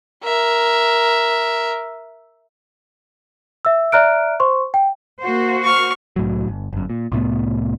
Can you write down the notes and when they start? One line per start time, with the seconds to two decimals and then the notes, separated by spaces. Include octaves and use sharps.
0.24 A#4 E5
3.65 E5 E6
3.92 D5 E5 A#5 F6 F#6 D7
4.40 C5 C6 C#6
4.74 G5
5.21 A#3 F#4 C5
5.64 C#6 F6
6.16 C2 A2 F#3
6.48 G1
6.73 G1 F#2
6.90 A#2
7.12 C2 A2 A3 B3